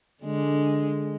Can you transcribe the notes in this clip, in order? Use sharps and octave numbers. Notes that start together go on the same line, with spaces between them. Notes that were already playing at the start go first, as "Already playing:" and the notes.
D3 G#3